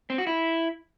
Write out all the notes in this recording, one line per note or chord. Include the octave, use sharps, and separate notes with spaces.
C4
F#4
E4